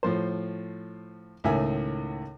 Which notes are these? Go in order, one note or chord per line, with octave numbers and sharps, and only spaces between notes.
A2 F3 C5
C#2 A2 D#3 E5 G#5